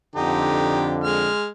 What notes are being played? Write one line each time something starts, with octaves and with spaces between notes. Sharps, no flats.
F2 D3 D#4 G4
G#3 F6